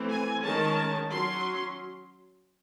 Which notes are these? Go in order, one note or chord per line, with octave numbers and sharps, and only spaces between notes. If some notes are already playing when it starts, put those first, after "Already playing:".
Already playing: E3 A3 C4
G#5
D#3 G#3 C#4 A5
F#3 C6
C#4